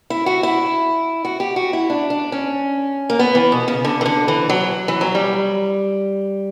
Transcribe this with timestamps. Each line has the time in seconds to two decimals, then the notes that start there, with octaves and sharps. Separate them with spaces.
0.10 E4
0.26 F#4
0.43 E4
1.25 F#4
1.40 G4
1.56 F#4
1.73 E4
1.90 D4
2.10 D4
2.32 C#4
3.10 A#3
3.19 B3
3.35 E3
3.52 B2
3.68 C#3
3.85 D3
4.01 E3
4.06 D3
4.28 E3
4.49 F#3
4.88 E3
5.01 F#3
5.15 G3